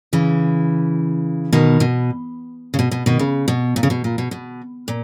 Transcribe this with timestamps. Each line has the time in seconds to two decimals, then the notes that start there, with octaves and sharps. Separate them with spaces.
0.13 C#3 E3
1.52 B2 D#3
1.80 B2
2.74 C#3
2.79 B2
2.91 B2
3.06 B2 D#3
3.19 C#3
3.48 B2
3.76 A#2
3.83 C#3
3.90 B2
4.04 A#2
4.18 B2
4.31 B2
4.88 A#2